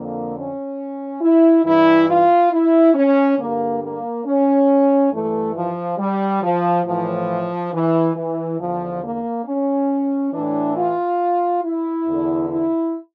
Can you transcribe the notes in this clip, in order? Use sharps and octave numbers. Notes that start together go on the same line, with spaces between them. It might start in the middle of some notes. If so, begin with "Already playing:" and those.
Already playing: F2 D3 A#3
C#4
E4
G2 E3 E4
F4
E4
C#4
G2 D3 A#3
A#3
C#4
G2 E3 A3
F3
G3
F3
A2 E3 F3
E3
E3
E2 D3 F3
A#3
C#4
A2 E3 D4
F4
E4
E2 D3
E4